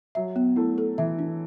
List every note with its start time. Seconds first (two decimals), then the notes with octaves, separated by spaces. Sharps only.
0.15 F#3 E5
0.36 B3
0.56 A3 E4
0.78 A4
0.98 E3 E5
1.19 D4